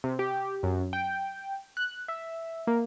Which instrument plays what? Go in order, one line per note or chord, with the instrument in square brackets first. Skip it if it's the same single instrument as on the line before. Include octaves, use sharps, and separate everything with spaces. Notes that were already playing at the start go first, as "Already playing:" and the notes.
[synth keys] C3
G4
F#2
G5
F#6
E5
A#3